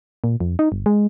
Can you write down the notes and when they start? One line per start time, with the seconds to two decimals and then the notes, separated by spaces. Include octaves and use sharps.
0.24 A#2
0.40 F2
0.59 D#4
0.72 G1
0.86 G#3